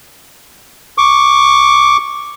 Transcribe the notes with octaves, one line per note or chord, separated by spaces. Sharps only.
C#6 D6